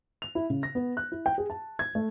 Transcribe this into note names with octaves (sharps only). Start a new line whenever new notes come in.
F7
E4
C#3
A#6
B3
F#6
E4
G5
G#4
A5
G#6
A3